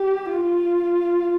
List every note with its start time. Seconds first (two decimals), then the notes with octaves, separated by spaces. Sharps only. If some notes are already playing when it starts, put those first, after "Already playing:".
Already playing: G4
0.29 F4